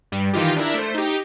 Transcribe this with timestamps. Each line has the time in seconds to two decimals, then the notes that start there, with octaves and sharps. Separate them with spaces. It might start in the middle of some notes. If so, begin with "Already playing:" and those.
0.12 G2 G3
0.33 D#3 E3 D#4 F4 G4
0.56 D4 E4 A#4 E5
0.74 A3 C5
0.95 D#4 G4